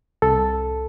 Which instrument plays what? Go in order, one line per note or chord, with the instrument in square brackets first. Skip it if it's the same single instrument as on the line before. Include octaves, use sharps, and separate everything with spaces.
[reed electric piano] C2 A4